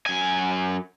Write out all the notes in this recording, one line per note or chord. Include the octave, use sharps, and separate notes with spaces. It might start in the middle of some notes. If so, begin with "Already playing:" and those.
F#2 G#5